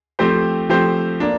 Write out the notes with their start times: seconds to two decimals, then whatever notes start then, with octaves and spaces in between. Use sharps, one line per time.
0.19 F3 A3 C4 G4 C5
0.69 F3 A3 C4 G4 C5
1.20 A#3 D4